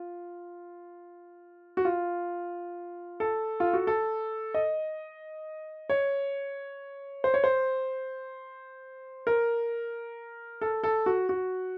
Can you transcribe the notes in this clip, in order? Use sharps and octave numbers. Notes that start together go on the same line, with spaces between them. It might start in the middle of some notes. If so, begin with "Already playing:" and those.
Already playing: F4
F#4
F4
A4
F4
F#4
A4
D#5
C#5
C5
C#5
C5
A#4
A4
A4
F#4
F#4